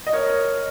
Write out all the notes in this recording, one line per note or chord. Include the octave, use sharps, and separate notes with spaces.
D#5
A#4 C#5